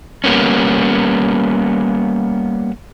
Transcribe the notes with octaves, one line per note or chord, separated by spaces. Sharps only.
G3 A#3 B3 C#4